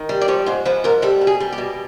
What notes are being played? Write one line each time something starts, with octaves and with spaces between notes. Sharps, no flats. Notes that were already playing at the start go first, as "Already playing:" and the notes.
Already playing: D#3
G3
D5
F3 C#5
G#2 C5
F3 B4
G#2 A#4
G3 A4
B2
G#4
G3
G4
B2